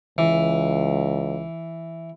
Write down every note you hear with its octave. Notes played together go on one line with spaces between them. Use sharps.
C#2 E3